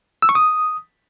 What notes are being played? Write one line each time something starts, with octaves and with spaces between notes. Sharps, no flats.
E6
C#6
D#6